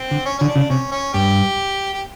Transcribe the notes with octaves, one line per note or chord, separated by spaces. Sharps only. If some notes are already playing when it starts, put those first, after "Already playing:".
Already playing: C4
D3
C#4
D3 C#4
D4
C#3
C3 C#4
C#4
G2 G4
G4